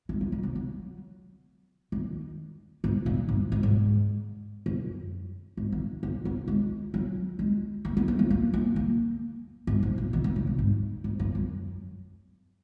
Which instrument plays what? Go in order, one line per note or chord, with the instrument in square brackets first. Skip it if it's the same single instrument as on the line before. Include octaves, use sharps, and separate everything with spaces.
[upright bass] G#3
F#3
D#3
C#3
F#3
D#3
G#2
A#2
G#2
G#2
G#2
F#2
G#2
D#3
C#4
C#4
G#3
F#3
G#3
A#3
C#4
A#3
F#3
A#3
A#3
A#3
G#2
G#2
A#2
D#3
D#3
C#3
C#3
G#2
G#2
F#2
F#2